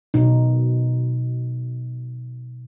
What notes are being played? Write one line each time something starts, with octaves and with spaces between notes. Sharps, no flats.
B2 D#4